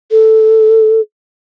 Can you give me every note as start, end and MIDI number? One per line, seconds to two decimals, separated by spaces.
0.11 1.01 69